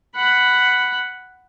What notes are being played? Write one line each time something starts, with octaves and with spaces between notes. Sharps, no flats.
F#5 B5